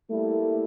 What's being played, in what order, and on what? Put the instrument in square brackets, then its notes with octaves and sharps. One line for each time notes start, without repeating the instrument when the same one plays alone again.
[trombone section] G3 A#3 E4 [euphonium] A3